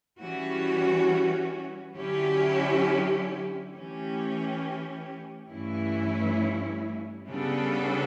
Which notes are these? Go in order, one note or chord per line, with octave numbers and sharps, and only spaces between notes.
E3 G3 C#4 F#4
D3 F#3 C#4 E4 G4
E3 A3 C#4 G4
G2 E3 A3 C#4 E4
C#3 G3 B3 D4 A4